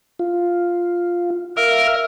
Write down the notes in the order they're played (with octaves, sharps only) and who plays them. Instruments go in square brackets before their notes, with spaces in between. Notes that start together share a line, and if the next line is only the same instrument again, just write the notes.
[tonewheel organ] F4
[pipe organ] A#4 [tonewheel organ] E5 F5